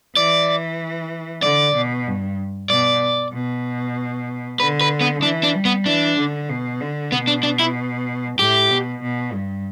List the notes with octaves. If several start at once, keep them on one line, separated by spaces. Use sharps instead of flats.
E3 D5
D3 D5
B2
G2
B2 D5
B2
D3 B4
B4
B3
E3 D4
D4
G3
B3
E3 D4
D3
B2
D3
B2 B3
D4
D4
E4
A2 G4
B2
B2
G2